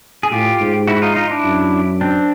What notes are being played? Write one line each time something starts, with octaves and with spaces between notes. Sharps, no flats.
G#4
A2 F4 G4
G#2
E4 F#4
D#4 F4
D#4 F4
D4 E4
F#2
C4 D4